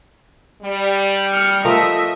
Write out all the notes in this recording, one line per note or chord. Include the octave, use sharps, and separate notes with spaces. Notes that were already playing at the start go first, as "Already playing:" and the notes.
G3
F6 C#7
F3 A3 A#4 D#5 E5